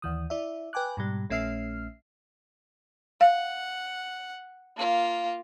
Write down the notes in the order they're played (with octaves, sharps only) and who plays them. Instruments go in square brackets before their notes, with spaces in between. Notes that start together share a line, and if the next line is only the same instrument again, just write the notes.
[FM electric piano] D#2 E3 D#6
E4 D5 E5
B4 G5 G#5 D6 F#6
G#2 B2 G3
A#1 A3 C#4 E5 F6 C7
[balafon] F5 [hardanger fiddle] F#5
[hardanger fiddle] A#3 F4